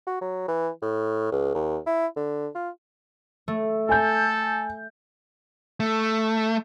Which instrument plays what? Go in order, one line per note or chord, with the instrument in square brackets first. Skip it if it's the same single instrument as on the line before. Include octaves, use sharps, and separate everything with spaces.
[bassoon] F#4
F#3
E3
A2
C#2
D#2
E4
D3
F4
[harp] A3
[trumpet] A4 [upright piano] G#5 G6
[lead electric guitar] A3